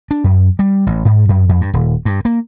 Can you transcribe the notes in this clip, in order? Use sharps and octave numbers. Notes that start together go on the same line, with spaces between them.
D4
F#2
G3
A1
G#2
F#2
F2
G2
D#1
G2
A#3